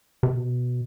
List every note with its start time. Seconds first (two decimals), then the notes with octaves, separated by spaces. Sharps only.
0.23 C3
0.35 B2